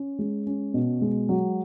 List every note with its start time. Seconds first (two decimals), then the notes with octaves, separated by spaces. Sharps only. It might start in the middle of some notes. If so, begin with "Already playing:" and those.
Already playing: C#4
0.19 G#3
0.47 C#4
0.74 B2
1.01 G#3
1.29 F#3